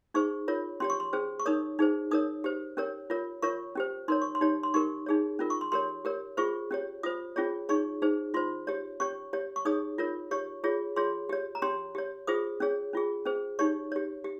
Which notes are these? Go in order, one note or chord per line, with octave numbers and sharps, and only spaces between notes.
D#4 G#4 C5 C#6
F4 A#4 C#5
C#4 G4 C#5 C6
C#6
C6
C#4 G#4 C5
C#6
D#4 A#4 C#5 D#6
D#4 G#4 C5
D#4 A#4 C#5 D#6
G4 C5
C#4 G4 A#4 C#5
F4 A#4 C#5
F4 A#4 C#5 C#6
C#4 G4 C5
D#4 A#4 C#5 C6
C#6
C6
D#4 G4 C#5
C6
D#4 G4 A#4 C#6
D#4 G#4 C#5
C#4 F4 A#4
C#6
C6
G4 A#4 C#5 C6
G4 A#4 C#5
F4 G#4 C5 C#6
C#4 G4 C#5
F4 C5 D#6
C#4 F4 G#4 C#5
D#4 G#4 C#5 C#6
D#4 G#4 C5
F4 C5 C6
G4 C#5
C#4 G4 C#5 C#6
G4 C#5
C#6
D#4 G#4 C#5 D#6
F4 A#4 C#5
G4 C#5 C#6
F4 G#4 C#5
F4 G#4 C#5 C6
G4 C#5
A#5
C#4 G4 C#5 C6
G4 C#5
F4 G#4 C5 D#6
C#4 G#4 C#5
C#4 F4 G#4
C#4 G#4 C5
D#4 G4 C#5 C#6
G4 C#5
G4